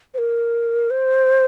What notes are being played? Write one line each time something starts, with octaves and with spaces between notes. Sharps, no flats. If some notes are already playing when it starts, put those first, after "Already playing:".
C5
A#4
C5